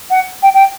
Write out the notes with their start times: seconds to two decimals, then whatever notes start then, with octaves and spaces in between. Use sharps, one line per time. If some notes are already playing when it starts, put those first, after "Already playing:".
0.11 F#5
0.43 G5
0.54 G5